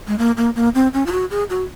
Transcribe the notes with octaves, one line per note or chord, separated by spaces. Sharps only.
G#3
A#3
A#3
A#3
C4
C#4
F4
F#4
G#4
F#4